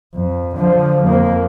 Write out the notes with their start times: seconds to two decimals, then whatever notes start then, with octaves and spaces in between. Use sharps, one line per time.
0.15 F2
0.56 D3 F3
1.05 F2 A#3